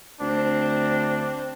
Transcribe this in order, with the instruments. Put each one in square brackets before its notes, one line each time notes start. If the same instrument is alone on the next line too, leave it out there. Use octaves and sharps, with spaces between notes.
[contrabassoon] D2 [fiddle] C4 [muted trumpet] D4